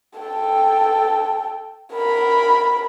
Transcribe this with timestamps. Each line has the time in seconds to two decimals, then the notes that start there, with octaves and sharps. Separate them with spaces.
0.19 A4 G5
1.95 A#4 B5